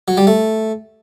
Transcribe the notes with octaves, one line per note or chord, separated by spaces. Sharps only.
F#3
G3
A3